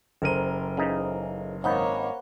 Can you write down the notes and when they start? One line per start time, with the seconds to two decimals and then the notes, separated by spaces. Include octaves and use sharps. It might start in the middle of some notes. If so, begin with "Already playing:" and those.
0.22 F#1 A4 A#4 C5 D#7
0.77 C#3 E3 D#4
1.64 G#1 A#3 D#4 C5 C#5 F#5 B5